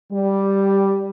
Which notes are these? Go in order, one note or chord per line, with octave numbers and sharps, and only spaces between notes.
G3